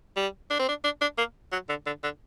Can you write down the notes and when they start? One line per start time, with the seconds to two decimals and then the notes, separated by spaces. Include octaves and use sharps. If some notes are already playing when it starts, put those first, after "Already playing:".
0.16 G3
0.50 D4
0.59 C4
0.68 D4
0.84 D4
1.01 D4
1.18 A#3
1.52 F#3
1.69 D3
1.86 D3
2.03 D3